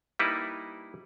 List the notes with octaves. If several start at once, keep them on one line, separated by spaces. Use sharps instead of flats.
G3 A#3 D#4 E4 B4